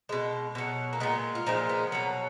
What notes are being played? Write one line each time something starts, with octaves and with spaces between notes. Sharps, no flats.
B2 G#3
B2 F#3
A#3
A#2 G#3 B3
F4
A#2 F3 G#3 D#4
B3
B2 F#3